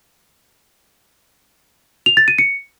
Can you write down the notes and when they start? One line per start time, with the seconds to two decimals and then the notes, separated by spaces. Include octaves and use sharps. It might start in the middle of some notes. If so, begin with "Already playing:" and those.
2.06 F7
2.17 A6
2.28 D#7
2.38 C#7